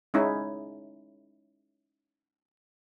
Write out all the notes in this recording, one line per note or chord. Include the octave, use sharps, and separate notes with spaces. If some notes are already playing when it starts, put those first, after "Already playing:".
G#3 C#4 D#4 E4